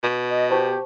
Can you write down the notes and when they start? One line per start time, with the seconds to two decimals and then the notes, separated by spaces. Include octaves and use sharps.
0.03 B2
0.30 D#5
0.51 G4 C5 A5 C#6